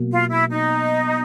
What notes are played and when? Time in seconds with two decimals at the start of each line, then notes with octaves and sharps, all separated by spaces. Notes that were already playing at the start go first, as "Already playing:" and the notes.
Already playing: B2 F#3 A#3
0.11 F4
0.30 E4
0.50 D#4